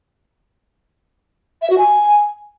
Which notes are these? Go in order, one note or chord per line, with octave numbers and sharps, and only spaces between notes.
E5
F#4
G#5